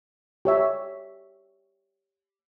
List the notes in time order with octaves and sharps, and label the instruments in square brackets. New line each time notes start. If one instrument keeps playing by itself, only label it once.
[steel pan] G4 C#5 E5